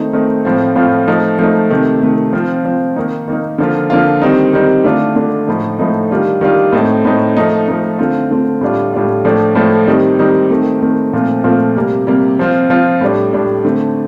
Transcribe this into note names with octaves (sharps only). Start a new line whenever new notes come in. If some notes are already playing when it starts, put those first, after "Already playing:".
Already playing: D#3 A3 C4 D#4
D#3 A3 C4 D#4
A2 F3 C4 F4
A2 F3 C4 F4
F3 A3 D#4
F3 A3 D#4
C3 D#3 A3
C3 D#3 A3
F3 C4 F4
F3 C4 F4
D#3 A#3 D#4
D#3 A#3 D#4
D3 F3 A#3 F4
D3 F3 A#3 F4
D#3 G3 C4 D#4
D#3 G3 C4 D#4
D3 A3 D4 F4
D3 A3 D4 F4
A2 F3 A3 D#4
A2 F3 A3 D#4
D#3 G3 D4 F4
D#3 G3 D4 F4
A2 A3 C4 D#4
A2 A3 C4 D#4
F3 A3 D#4
F3 A3 D#4
D3 A3 C4 F4
D3 A3 C4 F4
A2 G3 D4 F4
A2 G3 D4 F4
A2 F3 A3 D4
A2 F3 A3 D4
D#3 G3 C4 D#4
D#3 G3 C4 D#4
D#3 A3 C4
D#3 A3 C4
A#2 F3 A3 C4 F4
A#2 F3 A3 C4 F4
C3 G3 A#3
C3 G3 A#3
F3 C4 F4
F3 C4 F4
A2 G3 D4
A2 G3 D4
D3 A3 C4